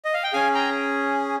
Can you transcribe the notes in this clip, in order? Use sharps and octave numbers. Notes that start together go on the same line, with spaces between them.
D#5
F5
G5
C#4 G#4 F5 G#5
G5 A#5